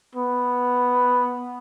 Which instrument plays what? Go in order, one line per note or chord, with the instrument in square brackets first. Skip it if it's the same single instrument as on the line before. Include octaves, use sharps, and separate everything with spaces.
[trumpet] B3